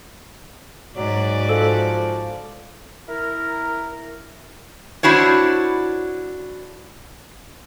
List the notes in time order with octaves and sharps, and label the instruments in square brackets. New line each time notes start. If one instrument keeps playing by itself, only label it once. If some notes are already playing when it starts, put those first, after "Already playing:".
[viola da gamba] G#2 F#4 D5 [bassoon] F#3
[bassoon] F3 [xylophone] A4
[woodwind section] E4 A#4
[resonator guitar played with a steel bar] D4 E4 F#4 C5 C#5